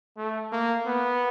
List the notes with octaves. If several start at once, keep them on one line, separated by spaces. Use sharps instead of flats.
A3
A#3
B3